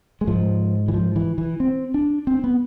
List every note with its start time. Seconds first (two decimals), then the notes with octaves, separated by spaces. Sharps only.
0.21 G#3
0.27 G#2 F3
0.88 E3
0.94 F3
1.16 E3
1.38 E3
1.60 C4
1.94 D4
2.27 C4
2.44 B3